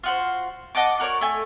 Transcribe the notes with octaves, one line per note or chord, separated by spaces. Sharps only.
F4 F#4 C5
D#5 F#5 A5 D6
F#4 A#4 C#5 D5
A3 G#5